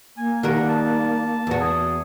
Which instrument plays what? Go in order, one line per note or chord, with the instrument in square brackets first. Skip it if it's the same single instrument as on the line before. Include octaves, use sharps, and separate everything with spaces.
[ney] A#3 [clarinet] G#5
[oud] D#3 G3 A#4 [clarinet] F#5
[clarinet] A5
[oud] E2 F#4
[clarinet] G#4